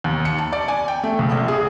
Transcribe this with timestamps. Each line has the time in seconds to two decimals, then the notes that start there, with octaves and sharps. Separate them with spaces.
0.04 D#2
0.25 C#7
0.38 A5
0.53 D5
0.68 G#5
0.88 G5
1.04 A3
1.19 C#2
1.32 A#1
1.48 G#4